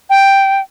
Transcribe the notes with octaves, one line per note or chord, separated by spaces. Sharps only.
G5